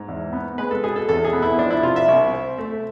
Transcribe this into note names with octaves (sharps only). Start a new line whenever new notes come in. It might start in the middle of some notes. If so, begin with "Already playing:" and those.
Already playing: G#2
E2
B3
G#3 B4
A4
B2 G#4
A4
E2 A4
G#4
B3
E4
F3 D4
E4
C3 F4
E5
C2
C4
A3